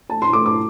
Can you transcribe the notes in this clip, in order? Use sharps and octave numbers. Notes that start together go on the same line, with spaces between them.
A3 A5
C6
A3 D6
D6